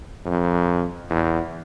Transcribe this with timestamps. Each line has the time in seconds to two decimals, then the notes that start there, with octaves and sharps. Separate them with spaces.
0.25 F2
1.10 E2